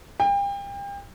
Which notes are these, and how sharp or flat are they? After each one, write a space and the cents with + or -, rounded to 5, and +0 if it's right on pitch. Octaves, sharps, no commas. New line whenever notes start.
G5 +35